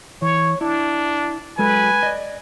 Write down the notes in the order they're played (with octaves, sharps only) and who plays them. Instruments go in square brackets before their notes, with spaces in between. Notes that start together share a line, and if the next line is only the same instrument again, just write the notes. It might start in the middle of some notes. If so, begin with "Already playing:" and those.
[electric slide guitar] E3 [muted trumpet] C#5
[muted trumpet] D4 [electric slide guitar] E4
[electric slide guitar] F#3 G#3 A4 [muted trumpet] B4 [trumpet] G#5
[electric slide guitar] D5 D#5